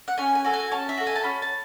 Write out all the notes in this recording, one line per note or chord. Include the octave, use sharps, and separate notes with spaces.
F#5
C#4 G#5
G#5
F#4 A4
G#5
C#4 A5
E5
F#4 A4
G#5
A5
C#4 B5
A5